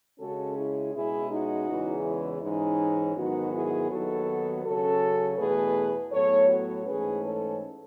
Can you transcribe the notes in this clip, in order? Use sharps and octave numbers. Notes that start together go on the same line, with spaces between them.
C#3 G#3 C#4 F#4 A4
E4 G#4
B2 G#3 C#4 E4 G#4
D#4 F#4
E2 C#3 E3 G#3
E4
G#2 E3 G#3 C#4 D#4
G#2 D#3 F#3 B3 D#4 F#4
E4 G#4
D#2 D#3 F#3 B3 F#4 A4
C#3 F#3 C#4 F#4 A4
E2 B2 A3 G#4 B4
A2 F#3 B3 A4 C#5
F#4 A4
G#2 E3 A3 C#4 G#4 B4
A4 C#5